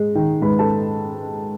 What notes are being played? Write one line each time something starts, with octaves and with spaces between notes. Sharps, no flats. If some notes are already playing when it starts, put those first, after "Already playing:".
Already playing: G#2 G#3
D#3
G#2 B4 B5
A4 A5